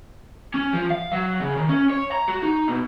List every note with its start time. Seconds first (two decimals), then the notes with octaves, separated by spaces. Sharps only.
0.54 C#4
0.73 F3
0.90 F5
1.12 F#3
1.40 C#3
1.57 D#3
1.69 C#4
1.90 C#5
2.11 A#5
2.28 F#4
2.43 D#4
2.68 B2